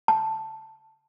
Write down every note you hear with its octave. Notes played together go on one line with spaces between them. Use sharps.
A5